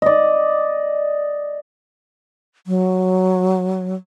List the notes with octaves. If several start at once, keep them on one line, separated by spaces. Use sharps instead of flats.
D5 D#5
F#3